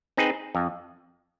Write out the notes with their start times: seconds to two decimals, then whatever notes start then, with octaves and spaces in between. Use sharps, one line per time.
0.17 C4 D#4 G#4 B4
0.55 F2